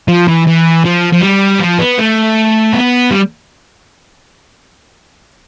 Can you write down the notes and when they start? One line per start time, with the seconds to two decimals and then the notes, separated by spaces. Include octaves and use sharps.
0.08 F3
0.28 E3
0.47 E3
0.85 F3
1.13 F3
1.22 G3
1.60 F3
1.79 B3
1.98 A3
2.73 B3
3.11 G3